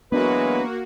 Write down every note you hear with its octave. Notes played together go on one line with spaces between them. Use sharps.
E3 F#3 G#3 A#3 B3 D4 F#4 B4